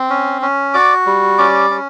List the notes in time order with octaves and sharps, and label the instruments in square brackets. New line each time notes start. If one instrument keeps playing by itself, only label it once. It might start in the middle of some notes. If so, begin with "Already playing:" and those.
Already playing: [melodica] C4
C#4
C#4
F#4 D5 D6
G3
C#4 D5 D6
C#4